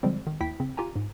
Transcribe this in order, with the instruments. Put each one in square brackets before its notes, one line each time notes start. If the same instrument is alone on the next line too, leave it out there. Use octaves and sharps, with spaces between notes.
[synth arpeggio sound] D3 F3 G3 G#3 C4
D#3
D#2 E4 G5 B6
C#3 C4
F4 G4 G#5 A#5
G#2